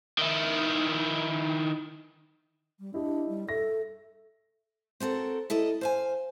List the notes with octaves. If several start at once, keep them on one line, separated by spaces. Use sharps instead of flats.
D#3 E4
G3
D4 E4 G4 D#5
G3
A4 E5 A#6
C4 F#4 A4 A#4
E4 A4 A#4 D#5
C5 F5 G#5